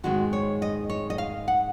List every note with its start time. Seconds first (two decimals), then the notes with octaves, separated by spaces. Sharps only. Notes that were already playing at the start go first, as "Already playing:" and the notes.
0.03 G#2 D#3 G#3 C4 F#4
0.33 C#5
0.62 D#5
0.90 C#5
1.10 D#5
1.18 F5
1.48 F#5